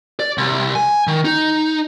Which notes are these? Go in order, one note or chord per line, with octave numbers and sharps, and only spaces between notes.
D5
C2
G#5
D#3
D#4